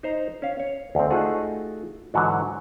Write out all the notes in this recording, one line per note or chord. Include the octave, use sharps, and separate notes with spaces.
D#4 C5 A#5
C#4 F5
C#5
D2 C4
A3 D#4 F4 F#4 G#4
G#2 D3 E3 F#3 F#4